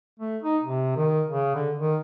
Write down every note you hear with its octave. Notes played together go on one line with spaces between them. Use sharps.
A3
D#4
C3
D#3
C#3
D3
D#3